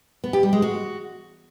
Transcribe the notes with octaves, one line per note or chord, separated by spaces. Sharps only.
B3
G4
G3
G#3
F#4